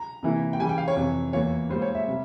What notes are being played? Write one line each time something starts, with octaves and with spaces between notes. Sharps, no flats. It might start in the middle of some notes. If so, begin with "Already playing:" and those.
Already playing: A#5
C3 E3 A#3 E4
G5
C#3 E3 G3 G#5
G5
F5
C#5
F2 C3 E3
E2 E3 A#3 F4 C#5
G#2 G3 A#3 F4 C5
C#5
E5
C3 G3